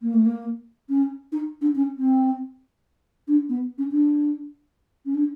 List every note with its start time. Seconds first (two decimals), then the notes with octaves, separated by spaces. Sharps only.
0.02 A#3
0.14 A3
0.26 A#3
0.89 C#4
1.32 D#4
1.61 D4
1.75 C#4
1.97 C4
3.28 D4
3.49 B3
3.78 C#4
3.92 D4
5.06 C#4
5.14 D4